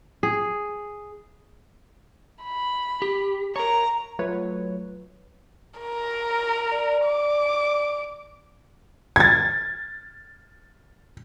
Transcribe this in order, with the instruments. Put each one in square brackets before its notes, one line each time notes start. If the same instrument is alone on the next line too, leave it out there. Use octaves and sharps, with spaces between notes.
[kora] G#4
[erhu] B5
[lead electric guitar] G4
[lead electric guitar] A#4 C#5 [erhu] A#5
[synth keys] F#3 A3 F4 B4 C#5
[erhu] A#4
[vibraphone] D5
[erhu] D6
[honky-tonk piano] G#6 A6